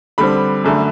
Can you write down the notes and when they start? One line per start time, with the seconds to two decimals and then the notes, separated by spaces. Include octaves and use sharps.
0.18 D3 G3 C4 B5
0.64 F#2 D3 A3